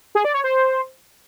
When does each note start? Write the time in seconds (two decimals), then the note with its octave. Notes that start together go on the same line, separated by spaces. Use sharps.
0.15 G#4
0.25 D5
0.34 C#5
0.44 C5